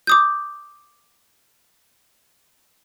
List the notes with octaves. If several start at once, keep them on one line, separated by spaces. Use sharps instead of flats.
D6 D#6 G6